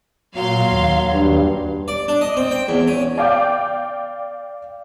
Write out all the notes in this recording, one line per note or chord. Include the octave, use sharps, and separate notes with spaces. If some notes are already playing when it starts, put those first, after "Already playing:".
A#2 F#3 F5 C6
D#2
G2
D5
D4
D#5
C4
G5
E2
C#4
D5 F5 G5 D6 G6